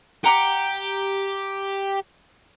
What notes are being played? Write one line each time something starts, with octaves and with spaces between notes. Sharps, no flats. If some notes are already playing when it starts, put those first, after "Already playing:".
G4 F#5 A#5 D6